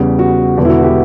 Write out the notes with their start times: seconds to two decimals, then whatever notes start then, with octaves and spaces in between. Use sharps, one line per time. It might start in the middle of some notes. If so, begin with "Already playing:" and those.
Already playing: E2 C#3 G3
0.19 F#4
0.57 E1 E2 D3
0.65 E4
0.70 F#4
0.82 E4 G4